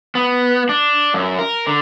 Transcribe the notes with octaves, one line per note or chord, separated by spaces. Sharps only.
B3
D4
F#2
A#4
D3